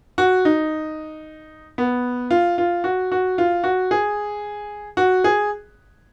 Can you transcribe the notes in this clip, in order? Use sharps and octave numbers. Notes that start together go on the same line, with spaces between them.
F#4
D#4
B3
F4
F4
F#4
F#4
F4
F#4
G#4
F#4
G#4